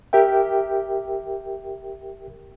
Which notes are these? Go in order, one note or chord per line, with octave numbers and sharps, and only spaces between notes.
G4 A#4 E5 G5